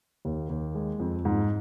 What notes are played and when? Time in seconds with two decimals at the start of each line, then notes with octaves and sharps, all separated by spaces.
0.25 D#2
0.49 D#2
0.75 G#3
1.00 F2
1.25 G#2